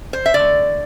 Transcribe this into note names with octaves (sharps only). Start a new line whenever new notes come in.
C5
E5
D3 A3 D5